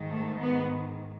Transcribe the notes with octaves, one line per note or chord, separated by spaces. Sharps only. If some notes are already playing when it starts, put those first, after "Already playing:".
Already playing: G#2 D#3
A3
B3